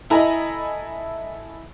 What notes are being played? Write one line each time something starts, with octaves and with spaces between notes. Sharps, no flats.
E4 A4 D#5 G#5 A#5 B5